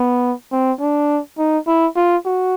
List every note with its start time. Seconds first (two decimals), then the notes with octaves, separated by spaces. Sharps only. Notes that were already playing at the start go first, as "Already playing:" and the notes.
Already playing: B3
0.52 C4
0.80 D4
1.38 D#4
1.67 E4
1.96 F4
2.25 F#4